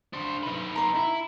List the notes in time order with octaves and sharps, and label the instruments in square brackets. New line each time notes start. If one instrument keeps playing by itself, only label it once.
[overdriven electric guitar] D4 C5
D#4 B4
[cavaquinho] A#5 C6
[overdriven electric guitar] E4